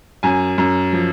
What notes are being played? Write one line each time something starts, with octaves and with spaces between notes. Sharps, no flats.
F#2 G#5
F#2
F3